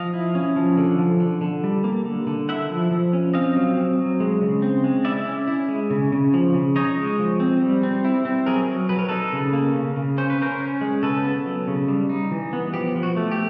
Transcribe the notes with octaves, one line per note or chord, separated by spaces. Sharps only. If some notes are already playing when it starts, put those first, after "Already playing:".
Already playing: F3 D#5 F5
E4
C#4
F3
D3
F3
D3
D3
G3
A#3
D3
D3
E4 E5 F#5
F3
F3
C#4
C4 D#5 F5
F#3
C4
F#3
G#3
C#3
C4
G#3
E4 D5 E5
C#4
E4
G#3
C#3
C#3
F3
C#3
D#4 C#5 D#5
G#3
F3
C4
G3
C4
E4
C4
F#3 G#4 A#4
F#3
F#3 B4
A#4
D#4 A4 B4
C#3
A#3
C#3
C#3
C#4 C5
B4
C#4 A#4 C5
C#4
G#3
C#3 A4 B4
B3
F#3
C#3
G3
D#4
E3
B3
F3 G4
F3
F#4
A3
G4